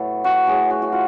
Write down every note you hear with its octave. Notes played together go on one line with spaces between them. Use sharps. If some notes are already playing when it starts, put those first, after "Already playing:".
Already playing: A2 F#3 B3 A4
F#4
A2 F#3 A3 G#4
F#4
F#4
F4